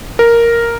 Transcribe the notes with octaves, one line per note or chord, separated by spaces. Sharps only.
A#4